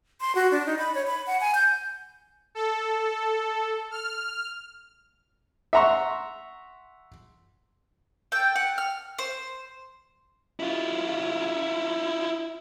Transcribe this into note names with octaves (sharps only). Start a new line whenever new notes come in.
C6
F#4
D4
D#4
B5
C#5
B5
F#5
G#5
G6
A4
F6
E5 F#5 A#5 C6 C#6
A4 G5
F#5
F6
C5
E4 F4